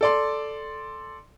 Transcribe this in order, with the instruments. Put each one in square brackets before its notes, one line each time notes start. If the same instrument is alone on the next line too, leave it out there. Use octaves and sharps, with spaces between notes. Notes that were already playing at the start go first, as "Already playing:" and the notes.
[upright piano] A4 D5 C6